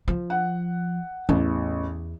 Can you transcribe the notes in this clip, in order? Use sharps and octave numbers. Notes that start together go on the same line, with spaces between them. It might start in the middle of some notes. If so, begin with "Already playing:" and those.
F3
F#5
A1 E2